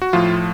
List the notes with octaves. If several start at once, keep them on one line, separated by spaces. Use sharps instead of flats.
F#4
A2 F3 F4